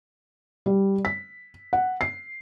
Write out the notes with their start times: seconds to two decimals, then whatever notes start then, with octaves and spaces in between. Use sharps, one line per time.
0.66 G3
1.05 B6
1.73 F#5
2.01 C7